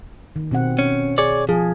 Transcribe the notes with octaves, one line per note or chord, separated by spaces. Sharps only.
D#3
B2 C4 F#5
C#4
G#4 C#5 D5
F3 G#4